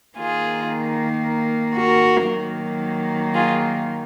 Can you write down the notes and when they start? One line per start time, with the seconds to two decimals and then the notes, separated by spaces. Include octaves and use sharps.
0.17 D#3 A#3 F4 G#4
1.76 F#4 A#4
2.28 D#3 F#3 A#3
3.34 F4 G#4